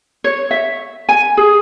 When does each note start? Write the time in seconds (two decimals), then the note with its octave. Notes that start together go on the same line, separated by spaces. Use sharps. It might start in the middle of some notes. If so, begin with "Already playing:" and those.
0.24 C#5
0.51 E5
1.09 G#5
1.37 G#4